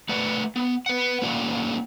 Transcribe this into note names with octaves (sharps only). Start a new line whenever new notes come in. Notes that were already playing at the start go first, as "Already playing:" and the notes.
A3 B4 D5 F#5
B3
B4 F#5
A3 A#3 C#4 F4 D5 F#5